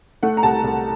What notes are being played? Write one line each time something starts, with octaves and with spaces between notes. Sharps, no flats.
A3 F#5
A#5
C2 A5
C2